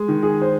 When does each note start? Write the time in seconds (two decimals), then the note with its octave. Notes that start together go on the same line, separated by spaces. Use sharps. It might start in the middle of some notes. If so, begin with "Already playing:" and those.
Already playing: G#3
0.08 D#3
0.23 G#4
0.41 C5